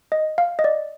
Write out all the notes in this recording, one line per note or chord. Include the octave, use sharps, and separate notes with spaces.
D#5
F5
D#5
D5